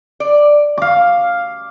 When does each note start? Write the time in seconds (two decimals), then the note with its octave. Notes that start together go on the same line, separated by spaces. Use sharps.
0.20 D5
0.78 F5 D6